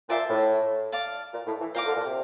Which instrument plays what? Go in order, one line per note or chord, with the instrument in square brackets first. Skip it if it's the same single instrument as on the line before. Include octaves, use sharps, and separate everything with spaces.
[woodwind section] A#2 [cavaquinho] C5 E5 A5 D6
[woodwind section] A2
[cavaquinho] D5 F5 A5
[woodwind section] A#2
A2
E3
[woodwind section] A#2 [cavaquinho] C5 F5 A#5 D6
[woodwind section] D3
A#2
C3